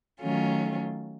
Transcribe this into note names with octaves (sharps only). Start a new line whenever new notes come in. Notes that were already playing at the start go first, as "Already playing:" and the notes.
D#3 F#3 A3 C#4 F4